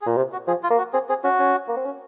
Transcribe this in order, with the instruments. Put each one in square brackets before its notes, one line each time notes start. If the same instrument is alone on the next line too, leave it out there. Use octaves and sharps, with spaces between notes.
[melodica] G#4
[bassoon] A#2
C3
[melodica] F#4
[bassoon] F3 [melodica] G#4
[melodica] F4
[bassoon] A#3
[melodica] F#4
[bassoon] C4 [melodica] G#4
[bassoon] C4 [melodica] G#4
[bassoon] C#4 [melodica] F#4
[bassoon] C#4
A#3
C4
C#4